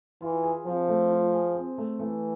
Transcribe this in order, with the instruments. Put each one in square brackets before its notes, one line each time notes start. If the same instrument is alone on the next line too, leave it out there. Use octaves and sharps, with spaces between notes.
[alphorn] E3 [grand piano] F4
[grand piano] G#4
[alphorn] F3 [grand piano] C4
[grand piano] A3
F4
G#4
C4
A3
[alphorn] E3 [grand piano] A3